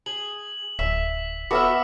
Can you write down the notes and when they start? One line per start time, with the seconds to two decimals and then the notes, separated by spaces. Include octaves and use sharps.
0.06 G#4 F#7
0.79 D1 E5 B6
1.51 B3 F#4 A4 E5 F#5 D6 E6 F6